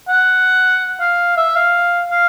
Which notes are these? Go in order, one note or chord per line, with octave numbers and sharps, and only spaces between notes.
F#5
F5
E5
F5
F5